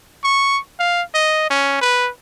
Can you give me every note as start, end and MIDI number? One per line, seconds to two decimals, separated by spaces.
0.24 0.59 85
0.80 1.02 77
1.14 1.46 75
1.50 1.77 61
1.82 2.10 71